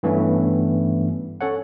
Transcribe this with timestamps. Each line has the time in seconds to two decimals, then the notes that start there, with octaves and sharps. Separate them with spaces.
0.03 G2 E3 A3 B3 C#4
1.41 C#4 A4 C#5 F#5